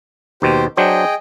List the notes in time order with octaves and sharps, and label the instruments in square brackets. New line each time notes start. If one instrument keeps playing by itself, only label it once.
[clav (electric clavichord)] D#2 B2 [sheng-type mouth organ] G4 C5
[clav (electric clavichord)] F#3 D4 C5 [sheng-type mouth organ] G#4 D#5 G5